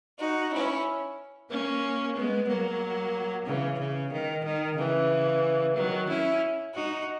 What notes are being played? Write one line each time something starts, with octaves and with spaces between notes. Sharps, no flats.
D#4 F#4
C#4 E4
A#3 C#4
G#3 B3
F#3 A#3
C#3 E3
C#3
D#3
D#3
C#3 E3
D#3 F#3
C#4 E4
D#4 F#4